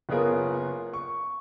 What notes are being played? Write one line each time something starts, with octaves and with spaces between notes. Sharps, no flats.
F#1 B3 F4 G#4 A#4 C#5
C#6